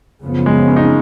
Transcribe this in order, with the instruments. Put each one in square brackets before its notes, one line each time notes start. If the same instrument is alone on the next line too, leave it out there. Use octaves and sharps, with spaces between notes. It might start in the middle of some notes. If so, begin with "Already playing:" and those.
[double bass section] F#2 C#3 F3 B3
[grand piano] G#3
C#4
D#4
C#4